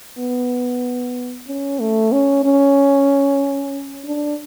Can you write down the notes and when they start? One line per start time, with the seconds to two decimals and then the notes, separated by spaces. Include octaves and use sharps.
0.18 B3
1.47 C#4
1.80 A3
2.12 C#4
2.44 C#4
4.05 D4